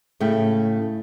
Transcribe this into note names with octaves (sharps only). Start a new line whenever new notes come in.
A2 C#3 A3 G5